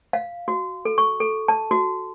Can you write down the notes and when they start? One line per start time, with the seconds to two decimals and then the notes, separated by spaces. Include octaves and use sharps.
0.13 F5
0.48 F#4
0.85 A4
0.98 C#6
1.20 A4
1.48 A5
1.71 F#4